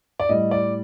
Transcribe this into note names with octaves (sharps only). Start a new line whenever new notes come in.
D5
A2 G3 D#5
D5